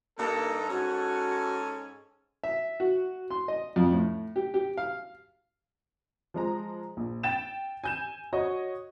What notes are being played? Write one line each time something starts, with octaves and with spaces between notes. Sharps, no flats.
G2 A#3 D#4 A4 A#5
G#2 C#4 F#4 A4 G#5
E5
F#4
C6
D#5
F2
A2
G4
G4
F5
F3 G#3 A#5
A#1
G5 A6 E7
G#5 G6 E7
F#4 C#5 D#5